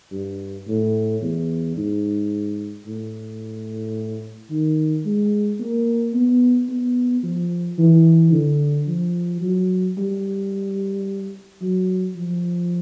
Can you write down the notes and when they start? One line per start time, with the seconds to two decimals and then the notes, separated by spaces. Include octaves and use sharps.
0.12 G2
0.67 A2
1.22 E2
1.76 G#2
2.86 A2
4.50 D#3
5.05 G#3
5.60 A#3
6.14 B3
6.69 B3
7.23 F3
7.78 E3
8.33 D3
8.88 F3
9.42 F#3
9.98 G3
11.61 F#3
12.16 F3